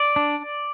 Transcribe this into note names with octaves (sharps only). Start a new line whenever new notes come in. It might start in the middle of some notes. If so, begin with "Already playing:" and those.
Already playing: D5
D4